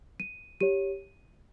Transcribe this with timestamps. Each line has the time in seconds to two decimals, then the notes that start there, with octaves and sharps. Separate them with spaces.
0.20 D#7
0.60 G4 C#5 D#7